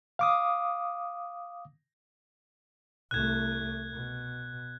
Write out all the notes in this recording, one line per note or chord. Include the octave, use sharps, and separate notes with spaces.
F5 D6 D#6
C2 A3 F#6 G#6
B2